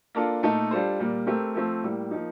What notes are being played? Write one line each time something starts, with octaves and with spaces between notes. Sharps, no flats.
A#3 D4 F4 A4
A#2 A3 D#4 A4
G3 D4 F4 A4 C5
A#2 G3 A#3
A3 C4 G4 A#4
F3 A3 C4
A2 G3 A#3
F3 A#3 D#4